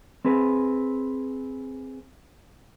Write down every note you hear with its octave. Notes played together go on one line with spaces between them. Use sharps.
C4 G#4 B4